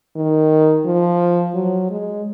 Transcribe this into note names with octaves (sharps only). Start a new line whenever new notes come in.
D#3
F3
F#3
G#3